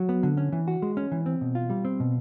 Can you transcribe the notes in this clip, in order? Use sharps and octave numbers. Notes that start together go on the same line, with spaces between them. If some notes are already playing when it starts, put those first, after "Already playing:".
Already playing: F#3
B3
D3
C#4
E3
F#4
G#3
C#4
E3
C4
B2
F4
G3
C4
B2